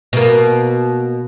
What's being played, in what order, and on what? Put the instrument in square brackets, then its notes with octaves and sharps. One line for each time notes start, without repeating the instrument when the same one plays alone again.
[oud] B2 A#3